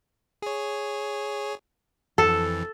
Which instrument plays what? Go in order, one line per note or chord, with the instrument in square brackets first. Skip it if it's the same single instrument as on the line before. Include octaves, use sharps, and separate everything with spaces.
[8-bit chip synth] G#4 C#5
[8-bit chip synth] F2 E3 [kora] A4